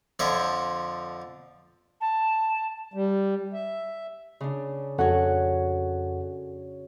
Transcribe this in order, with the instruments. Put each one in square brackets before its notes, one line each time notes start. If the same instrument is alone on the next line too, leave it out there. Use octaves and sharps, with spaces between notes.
[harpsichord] F2 D3 F3 C#5 E5
[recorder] A5
[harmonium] G3
E5
[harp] C#3 D4
[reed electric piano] F2 A4 F#5 [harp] C#4 F#4 C#5